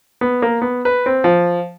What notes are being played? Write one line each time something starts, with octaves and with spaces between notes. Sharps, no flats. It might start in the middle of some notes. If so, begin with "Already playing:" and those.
B3
A#3
B3
B4
C4
F3